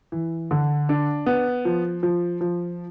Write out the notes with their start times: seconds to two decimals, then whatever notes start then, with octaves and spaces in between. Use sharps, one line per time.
0.12 E3
0.51 D3
0.89 D4
1.26 B3
1.65 F3
2.03 F3
2.41 F3